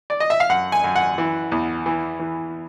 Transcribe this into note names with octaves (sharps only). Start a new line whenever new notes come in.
D5
D#5
E5
F5
F#2 F#5
G#5
F#2
F#5
E3
E2
E3
E3